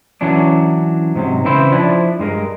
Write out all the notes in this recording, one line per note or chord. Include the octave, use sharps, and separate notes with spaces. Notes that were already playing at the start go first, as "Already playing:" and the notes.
E3 F#3 C#4 D4
G#2 C3 F#3
C#3 E3 C4 E4 C5
F3 D4 E4
G2 G#3 A#4